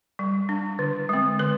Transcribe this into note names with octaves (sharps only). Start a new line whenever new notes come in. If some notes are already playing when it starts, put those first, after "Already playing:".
G3
D4
D3
G#3 C4
D3 B4